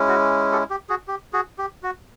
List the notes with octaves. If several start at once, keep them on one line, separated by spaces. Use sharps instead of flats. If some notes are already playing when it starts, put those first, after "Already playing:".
Already playing: G#3 C#4 E4
F#4
G4 A4
G4
F#4 G#4
G4
F#4 G#4
G4
F#4